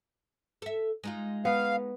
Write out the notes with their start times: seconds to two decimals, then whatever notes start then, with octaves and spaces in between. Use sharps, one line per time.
0.62 A4 E5
1.04 G#3 D#4 F4
1.45 B3 F5